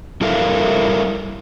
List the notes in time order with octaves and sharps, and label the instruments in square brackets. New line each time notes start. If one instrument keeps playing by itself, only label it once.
[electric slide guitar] G3 E4 A4 A#4 E5 F5